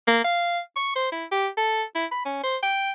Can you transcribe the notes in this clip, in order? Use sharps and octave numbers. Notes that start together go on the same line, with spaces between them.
A#3
F5
C#6
C5
E4
G4
A4
E4
B5
C#4
C5
G5